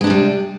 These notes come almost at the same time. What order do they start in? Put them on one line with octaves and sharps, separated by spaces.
G#3 D4 C3 G3